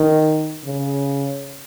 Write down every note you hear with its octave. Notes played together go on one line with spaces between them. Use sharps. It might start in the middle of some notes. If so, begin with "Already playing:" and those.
Already playing: D#3
C#3